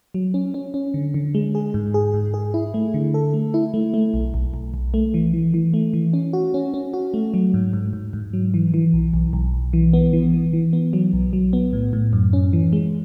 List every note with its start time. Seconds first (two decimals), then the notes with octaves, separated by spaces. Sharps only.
0.14 F#3
0.34 C#4
0.54 C#4
0.74 C#4
0.94 D3
1.14 D3
1.35 G#3
1.55 G#4
1.74 G#2
1.94 G#4
2.14 G#2
2.34 G#4
2.54 E4
2.74 A3
2.94 D3
3.14 A4
3.34 A3
3.54 E4
3.74 A3
3.94 A3
4.14 B1
4.34 B1
4.54 B1
4.74 B1
4.94 A3
5.14 E3
5.33 E3
5.54 E3
5.74 A3
5.93 E3
6.13 C#4
6.33 F#4
6.54 C#4
6.74 C#4
6.94 F#4
7.14 A3
7.34 F#3
7.54 G#2
7.73 G#2
7.93 G#2
8.13 G#2
8.33 F#3
8.54 E3
8.74 E3
8.93 B1
9.14 B1
9.33 B1
9.54 B1
9.73 E3
9.93 B3
10.13 E3
10.34 E3
10.53 E3
10.73 B3
10.93 F#3
11.13 B1
11.33 F#3
11.53 B3
11.73 A2
11.93 A2
12.13 F#2
12.33 C#4
12.53 E3
12.73 G#3